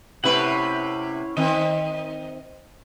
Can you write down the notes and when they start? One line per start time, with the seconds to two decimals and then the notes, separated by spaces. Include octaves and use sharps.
0.24 C3 A3 C#4 E4 B4 F#5
1.37 D#3 C4 D#5